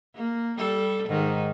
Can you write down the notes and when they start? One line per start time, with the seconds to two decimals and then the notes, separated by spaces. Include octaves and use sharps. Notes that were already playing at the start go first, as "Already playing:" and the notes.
0.15 A#3
0.58 G3 A4
1.09 G#2 D#3